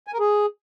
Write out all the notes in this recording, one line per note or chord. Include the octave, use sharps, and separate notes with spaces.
G#5
A#4
G#4